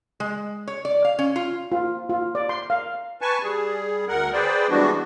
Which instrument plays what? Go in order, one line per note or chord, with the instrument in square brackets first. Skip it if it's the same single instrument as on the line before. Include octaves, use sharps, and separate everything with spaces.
[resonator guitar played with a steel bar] G#3
C#5
D5
F5
C#4
F4
[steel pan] F4
F4
D5
C6
F5
[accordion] B4 G#5 A5 C#6
G3 G#4
D2 A#4 F#5
G#4 B4 C5 D5 G5
E3 G3 G#3 B3 D4 F#4